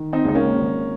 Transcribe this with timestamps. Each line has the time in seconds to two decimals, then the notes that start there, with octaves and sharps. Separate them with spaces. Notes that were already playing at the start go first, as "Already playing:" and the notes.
Already playing: D#3
0.13 C4 D#4
0.25 C#2 D#4
0.35 A#3 C#4
0.57 G#1